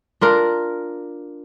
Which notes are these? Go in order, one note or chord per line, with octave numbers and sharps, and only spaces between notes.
D4 F4 A#4